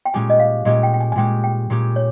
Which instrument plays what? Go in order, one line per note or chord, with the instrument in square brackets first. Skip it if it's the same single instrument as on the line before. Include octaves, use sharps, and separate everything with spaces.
[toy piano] G5
[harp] A#2 G#3 C#4 G4 [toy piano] G#5
[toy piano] D#5
F5
[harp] A#2 G#3 C#4 G4 [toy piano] D#5
[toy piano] G5
G5
G#5
G#5
[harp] A#2 G#3 C#4 G4 [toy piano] G5
[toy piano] G5
[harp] A#2 G#3 C#4 G4
[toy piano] C#5